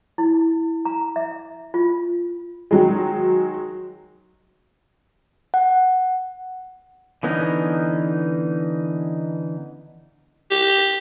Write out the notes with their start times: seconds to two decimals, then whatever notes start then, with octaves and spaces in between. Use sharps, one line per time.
0.18 E4
0.85 A#5
1.16 E5
1.74 F4
2.71 D#3 F#3 G#3
5.54 F#5
7.23 D3 E3 B3 C#4 D#4
10.51 G4